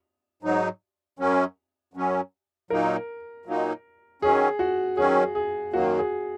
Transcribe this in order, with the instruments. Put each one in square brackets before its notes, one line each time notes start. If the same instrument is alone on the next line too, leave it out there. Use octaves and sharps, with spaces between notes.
[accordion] G#2 F#3 D#4
F#2 F#3 C#4
F#2 F#3 C#4
[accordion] A#2 F#3 A#3 D#4 [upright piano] A#4
[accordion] A#2 F#3 A#3 D#4
[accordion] D#3 F#3 C#4 [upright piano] G#4
[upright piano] F#4
[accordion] D#3 F#3 C#4 [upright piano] G#4
[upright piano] G#4
[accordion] F#2 D#3 F#3 A#3 [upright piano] F#4
[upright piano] G#4